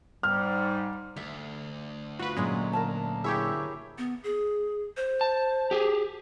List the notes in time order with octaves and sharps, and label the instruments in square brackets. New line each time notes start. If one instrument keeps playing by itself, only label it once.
[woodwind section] G#2 G3 [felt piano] F6
[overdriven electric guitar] D2 [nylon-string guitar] E5
[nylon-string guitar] F4 [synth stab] F#4 B4
[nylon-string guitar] A#2 F#3 C#4 [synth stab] G#3
[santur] A#4 F5 A5
[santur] E4 G#4 [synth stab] G4 C#5 E5
[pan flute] B3
G#4
C5
[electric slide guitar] A5
G4 G#4